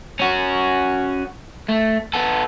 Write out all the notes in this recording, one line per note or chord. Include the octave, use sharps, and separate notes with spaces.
C#4 F#4
A3
B3 A4